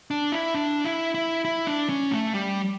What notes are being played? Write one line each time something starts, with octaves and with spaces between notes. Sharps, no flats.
D4
E4
D4
E4
E4
E4
D4
C#4
A3
G3